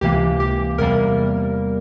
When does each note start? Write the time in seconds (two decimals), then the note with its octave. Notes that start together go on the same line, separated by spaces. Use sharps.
0.01 C#2 C3 E3 A#3 G4
0.40 G4
0.78 E2 C3 G3 A#3 A#4